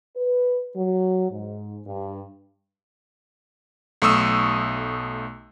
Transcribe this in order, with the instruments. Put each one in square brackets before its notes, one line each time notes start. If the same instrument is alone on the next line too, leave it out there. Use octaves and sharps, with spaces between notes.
[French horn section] B4
F#3
G#2
G2
[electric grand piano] B1 A3 C#6 D#6 E6